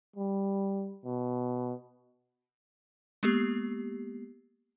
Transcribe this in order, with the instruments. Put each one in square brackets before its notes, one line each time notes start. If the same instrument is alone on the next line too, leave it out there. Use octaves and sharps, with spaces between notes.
[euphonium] G3
B2
[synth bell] G#3 A#3 B3 G4 C7